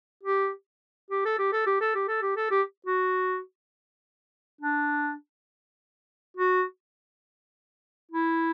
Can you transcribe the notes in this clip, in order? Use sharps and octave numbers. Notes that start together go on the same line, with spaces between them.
G4
G4
A4
G4
A4
G4
A4
G4
A4
G4
A4
G4
F#4
D4
F#4
E4